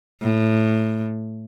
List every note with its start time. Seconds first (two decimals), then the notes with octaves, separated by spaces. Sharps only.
0.22 A2